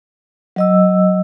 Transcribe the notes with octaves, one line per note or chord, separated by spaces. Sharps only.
F#3 D#5 E6